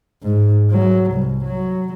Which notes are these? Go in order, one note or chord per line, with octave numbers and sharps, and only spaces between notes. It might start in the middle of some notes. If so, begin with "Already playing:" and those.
G#2
F#3
C2
F#3